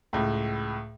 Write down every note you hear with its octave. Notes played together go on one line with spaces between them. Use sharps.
C#2 A2